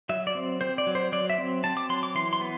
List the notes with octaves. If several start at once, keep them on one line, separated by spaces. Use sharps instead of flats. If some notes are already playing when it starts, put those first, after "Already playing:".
F#3 E5
D5
C4
C4 C5
D5
F#3
C5
F#3 D5
E5
C4
C4 A5
D6
F#3 C6
D6
E3 C6
C6
B3